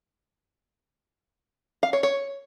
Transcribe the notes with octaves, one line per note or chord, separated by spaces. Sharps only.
F5
C#5
C#5